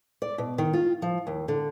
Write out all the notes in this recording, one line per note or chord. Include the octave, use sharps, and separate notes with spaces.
D5
B2
D#3
F4
F3
D#2
D3